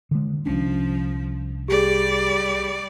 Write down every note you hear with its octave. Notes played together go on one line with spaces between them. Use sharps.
D3 G#3
C2 F3 C#4 D4
G3 G4 G#4 D5